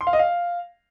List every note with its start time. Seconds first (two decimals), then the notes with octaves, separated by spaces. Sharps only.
0.01 C6
0.07 F5
0.13 D#5
0.19 F5